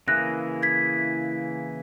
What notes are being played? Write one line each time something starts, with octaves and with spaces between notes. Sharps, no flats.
C#3 E3 A#3 E4 G#4 F#6 A#6
G#6 B6